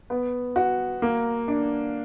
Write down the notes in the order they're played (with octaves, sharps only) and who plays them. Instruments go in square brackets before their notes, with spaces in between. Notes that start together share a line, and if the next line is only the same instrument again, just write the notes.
[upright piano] B3
F#4
A#3
D4